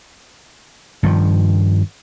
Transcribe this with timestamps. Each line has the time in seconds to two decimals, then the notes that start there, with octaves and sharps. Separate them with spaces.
1.03 G2 D#3 F3